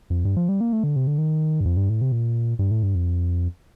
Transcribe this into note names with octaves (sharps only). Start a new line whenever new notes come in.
F2
G2
F3
G3
A#3
A3
D3
C3
D3
D#3
G2
F2
G2
A2
C3
A#2
G2
A2
G2
F2